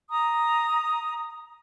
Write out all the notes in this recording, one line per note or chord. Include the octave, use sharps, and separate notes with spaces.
A#5 D#6